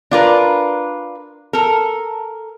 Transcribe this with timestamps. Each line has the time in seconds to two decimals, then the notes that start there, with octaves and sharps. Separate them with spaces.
0.11 D4 F4 A#4 B4
1.53 A4 A#4